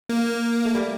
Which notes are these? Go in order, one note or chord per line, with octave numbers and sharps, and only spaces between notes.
A#3
A3
G3